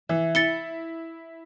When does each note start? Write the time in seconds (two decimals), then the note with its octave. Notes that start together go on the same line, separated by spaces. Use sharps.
0.09 E3 E5
0.35 E4 A6 C#7 G7